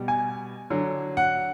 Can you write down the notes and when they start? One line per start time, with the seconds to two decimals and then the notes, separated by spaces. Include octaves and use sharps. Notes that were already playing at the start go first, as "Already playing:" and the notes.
Already playing: B2 G3
0.08 G#5
0.70 D3 F#3
1.17 F#5